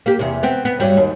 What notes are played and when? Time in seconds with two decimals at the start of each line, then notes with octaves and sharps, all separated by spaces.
0.06 A#3 G4
0.19 E2 C3
0.43 B3 C4
0.65 B3
0.80 G2 F#3 G3
0.97 D#2